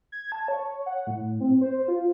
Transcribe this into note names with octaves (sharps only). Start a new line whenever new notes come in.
G#6
A5
C#5
F#5
A2
C4
C5
F4